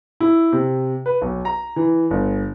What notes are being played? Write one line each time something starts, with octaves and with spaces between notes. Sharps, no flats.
E4
C3
B4
B1
A#5
E3
G1